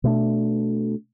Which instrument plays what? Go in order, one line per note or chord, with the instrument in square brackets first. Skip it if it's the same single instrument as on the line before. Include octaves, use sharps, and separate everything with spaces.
[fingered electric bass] B2 A3 D4